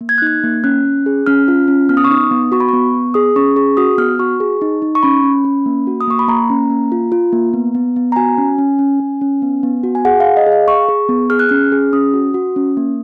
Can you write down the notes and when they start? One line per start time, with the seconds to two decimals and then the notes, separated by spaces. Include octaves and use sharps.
0.01 A#3
0.09 G#6
0.18 F#6
0.22 D#4 G#6
0.43 A#3
0.64 C#4 F#6
0.85 C#4
1.06 G#4
1.26 C#4 F6
1.48 F4
1.68 C#4
1.89 B3 F6
1.97 D#6
2.04 C#6
2.10 D#4 D#6
2.31 B3
2.52 F#4 C#6
2.60 B5
2.69 B3 C#6
2.94 B3
3.14 G#4 D#6
3.36 C#4 C#6
3.56 G#4 C#6
3.77 F#4 D#6
3.98 B3 F6
4.19 F#4 C#6
4.40 G#4
4.61 D#4
4.82 D#4
4.95 C#6
5.03 C#4 B5
5.24 C#4
5.45 C#4
5.66 A#3
5.87 F#4
6.01 D#6
6.08 A#3 C#6
6.19 B5
6.28 A#3 A#5
6.50 C#4
6.70 A#3
6.92 F4
7.12 F4
7.33 A#3
7.54 B3
7.75 B3
7.96 B3
8.12 A#5
8.16 F#4 G#5
8.38 C#4
8.58 C#4
8.79 C#4
9.00 C#4
9.21 C#4
9.42 B3
9.63 B3
9.84 F#4
9.95 G#5
10.05 G#4 F#5
10.20 F5
10.25 G#4
10.37 D#5
10.46 G#4
10.52 F5
10.68 G#4 C#6
10.89 G#4
11.09 B3
11.30 G#4 F6
11.39 F#6
11.49 C#4 F6
11.72 G#4
11.93 C#4 D#6
12.14 F#4
12.34 F#4
12.56 C#4
12.77 A#3